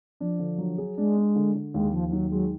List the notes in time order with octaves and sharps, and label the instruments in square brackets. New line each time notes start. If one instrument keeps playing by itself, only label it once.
[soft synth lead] F3 [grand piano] D4
[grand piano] D3
F#3
G#4
[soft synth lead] G#3 [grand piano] D4
[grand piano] D4
D3
D3
[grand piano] D#2 [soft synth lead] G#3
[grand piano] D#2 [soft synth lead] F3
[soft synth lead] F3
[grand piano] D#3 [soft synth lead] F#3
[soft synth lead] F#3 [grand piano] G#3